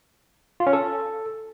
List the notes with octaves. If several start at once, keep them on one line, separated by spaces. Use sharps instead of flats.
F4
C#4
A4